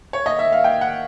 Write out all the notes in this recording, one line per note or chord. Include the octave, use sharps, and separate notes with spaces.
C#5
D#5
E5
F5
G5
F#5